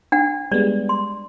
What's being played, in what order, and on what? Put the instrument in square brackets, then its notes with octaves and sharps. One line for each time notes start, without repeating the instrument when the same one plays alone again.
[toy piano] D4 F#5
[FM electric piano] G3 G#3 B3 [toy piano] D5
[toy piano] C6